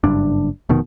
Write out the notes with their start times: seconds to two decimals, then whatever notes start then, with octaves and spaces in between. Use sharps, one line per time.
0.04 F#1 G2 D4
0.69 F1 B2 D#3